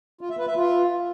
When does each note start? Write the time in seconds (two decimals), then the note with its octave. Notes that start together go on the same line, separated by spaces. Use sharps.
0.21 F4
0.30 E5
0.38 B4
0.47 E5
0.56 F4